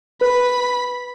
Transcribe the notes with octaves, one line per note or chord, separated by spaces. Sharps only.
B4 B5